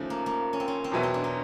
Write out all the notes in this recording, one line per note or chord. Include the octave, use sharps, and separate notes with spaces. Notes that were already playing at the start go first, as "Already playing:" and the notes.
Already playing: D#2 C#3 F3 A3
A#3
A#3
C#4
C4
C#4
C4
E2 B2 F#3 B3 E4
C4
D4
D#4